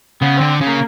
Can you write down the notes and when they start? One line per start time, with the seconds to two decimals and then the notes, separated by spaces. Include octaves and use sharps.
0.22 C#3 B3
0.37 D3 C4
0.61 C#3
0.67 A#3